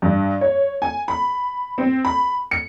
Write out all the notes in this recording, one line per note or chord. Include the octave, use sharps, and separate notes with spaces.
G2
C#5
G#5
B5
C4
B5
C#7